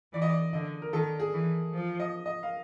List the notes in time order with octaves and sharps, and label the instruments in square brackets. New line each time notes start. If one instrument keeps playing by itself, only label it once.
[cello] E3 [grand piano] D5
[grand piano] D#5
D5
[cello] D3 [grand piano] D#5
[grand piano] A#4
[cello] D#3 [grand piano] A4
[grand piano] G#4
[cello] E3
F3
[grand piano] D#5
D#5
F5